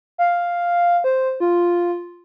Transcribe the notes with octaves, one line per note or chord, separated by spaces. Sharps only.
F5
C5
F4